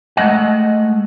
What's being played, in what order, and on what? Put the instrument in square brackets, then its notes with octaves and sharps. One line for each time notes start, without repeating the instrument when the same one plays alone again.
[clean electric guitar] G#3 A3 D#5 F#5